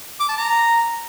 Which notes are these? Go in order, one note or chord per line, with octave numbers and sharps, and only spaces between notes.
D6
A5
A#5